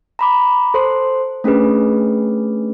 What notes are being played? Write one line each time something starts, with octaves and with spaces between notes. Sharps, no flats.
A#5 B5 D6
A4 C5 C6
A3 C#4 D4 G#4 B4